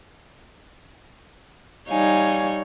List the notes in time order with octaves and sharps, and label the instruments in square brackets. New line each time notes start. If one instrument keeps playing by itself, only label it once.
[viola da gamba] G3 D#4 C#5 [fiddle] F5 G#5